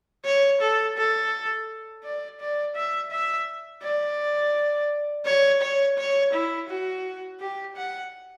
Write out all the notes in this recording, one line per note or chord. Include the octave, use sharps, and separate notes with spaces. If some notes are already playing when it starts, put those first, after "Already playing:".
C#5
A4
A4
D5
D5
E5
E5
D5
C#5
C#5
C#5
E4
F#4
G4
F#5